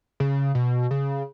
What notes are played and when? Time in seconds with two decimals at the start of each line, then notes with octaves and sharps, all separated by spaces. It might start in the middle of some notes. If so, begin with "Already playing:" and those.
0.20 C#3
0.55 B2
0.91 C#3